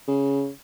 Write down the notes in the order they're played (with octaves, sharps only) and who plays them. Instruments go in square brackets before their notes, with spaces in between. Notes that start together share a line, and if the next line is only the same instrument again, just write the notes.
[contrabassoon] C#3